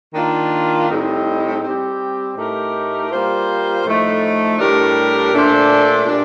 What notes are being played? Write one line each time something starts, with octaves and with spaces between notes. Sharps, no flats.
D#3 A#3 D4 F4
A2 G3 C4 D#4
G3 C4 G4
A2 A3 D#4 G4 A#4
G3 A#3 F4 C5
A2 F3 A3 D#4
A2 G3 D4 G4 A#4
A#2 A3 D4 A4 C5
A#2 G3 D4